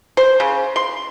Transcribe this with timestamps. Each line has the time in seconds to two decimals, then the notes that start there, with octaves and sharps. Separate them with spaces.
0.17 C5
0.40 C#3
0.76 C6